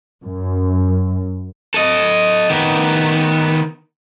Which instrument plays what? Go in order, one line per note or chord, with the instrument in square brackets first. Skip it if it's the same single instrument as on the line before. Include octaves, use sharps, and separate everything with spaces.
[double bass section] F#2
[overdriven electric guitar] A4 D#5
D#3 B3